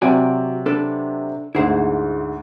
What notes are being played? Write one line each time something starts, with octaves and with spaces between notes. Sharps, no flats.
C3 F#3 C4 F#4 D5 G#5
D4 A4 B4
D2 G#2 E4 G#4 C5